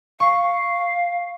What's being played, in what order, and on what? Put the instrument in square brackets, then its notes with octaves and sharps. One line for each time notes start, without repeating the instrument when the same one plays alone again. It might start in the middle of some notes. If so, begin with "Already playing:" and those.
[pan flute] F5 [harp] C#6